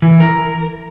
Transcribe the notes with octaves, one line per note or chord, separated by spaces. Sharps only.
E3
A#4